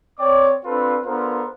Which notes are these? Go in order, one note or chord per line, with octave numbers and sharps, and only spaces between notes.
C4 C#5 D5 G5 D6
C4 D4 F4 A4 B4
B3 D4 F4 A4 A#4 C5